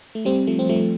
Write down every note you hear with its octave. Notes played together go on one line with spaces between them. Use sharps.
A3
G3 C4
F3 A3
C4
F3 A3